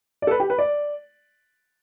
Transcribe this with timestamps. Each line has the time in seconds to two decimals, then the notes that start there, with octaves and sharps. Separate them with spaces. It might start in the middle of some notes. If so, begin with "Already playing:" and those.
0.22 D5
0.27 A4
0.31 B4
0.40 G4
0.50 B4
0.58 D5